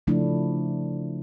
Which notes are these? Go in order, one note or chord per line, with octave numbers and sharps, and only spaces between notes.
C#3 F3 A3 D4 E4